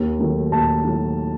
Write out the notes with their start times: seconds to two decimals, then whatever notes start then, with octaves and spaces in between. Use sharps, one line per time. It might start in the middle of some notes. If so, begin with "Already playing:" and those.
Already playing: D#2
0.19 D#3 F#3 A3
0.52 D#2 A5
0.84 D#3 F#3 A3